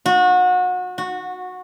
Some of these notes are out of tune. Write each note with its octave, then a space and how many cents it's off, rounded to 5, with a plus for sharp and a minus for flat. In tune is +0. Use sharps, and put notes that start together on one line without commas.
F#4 -30
F#4 -15